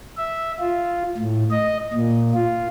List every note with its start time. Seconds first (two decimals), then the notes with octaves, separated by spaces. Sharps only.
0.17 E5
0.59 F4
1.17 A2
1.51 D#5
1.93 A#2
2.34 F4